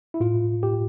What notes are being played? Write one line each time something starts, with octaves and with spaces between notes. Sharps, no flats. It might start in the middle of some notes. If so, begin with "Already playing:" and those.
E4
A2 F4
A2 G4